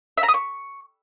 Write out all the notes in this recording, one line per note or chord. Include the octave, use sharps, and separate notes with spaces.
E5
A#5
D#6
C#6